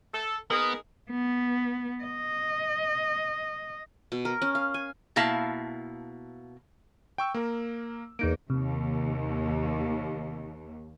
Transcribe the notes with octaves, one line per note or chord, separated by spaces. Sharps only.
A4
B3 D#4 G#4 A#4
B3
D#5
B2
A#4
C#4
F5
G#5
B2 A#3 E4 F5 A5
G5 C#6 E6
A#3 A#4
E2 A#3 D#4 D7
D#2 C3